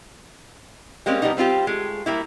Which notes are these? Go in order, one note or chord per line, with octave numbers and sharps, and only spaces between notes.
G3 G#3 A#3 C4 C#4
F3 G3 A#3 B3 D#4
G3 C4 F4 G4
G#3 A3
G3 A#3 E4